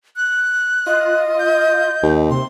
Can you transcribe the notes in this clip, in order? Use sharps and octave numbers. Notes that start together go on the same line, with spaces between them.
F#6
F4 D#5
G6
D#2
C3 C6